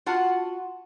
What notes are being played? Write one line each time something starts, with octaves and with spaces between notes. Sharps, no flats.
F4 F#4 F#5 A5